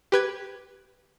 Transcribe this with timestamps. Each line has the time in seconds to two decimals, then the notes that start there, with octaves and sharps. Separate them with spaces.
0.12 G4 B4 G#6